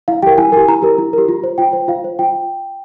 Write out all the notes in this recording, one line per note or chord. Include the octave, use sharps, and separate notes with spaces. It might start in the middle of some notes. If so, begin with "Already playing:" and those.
E4 F5
G4 A#4 G5
E4 G#5
G4 A#4 G#5
E4 A#5
G4 A#4
E4
G4 A#4
F4
C5
F4 G5
C5
F4 F5
C5
F4 G5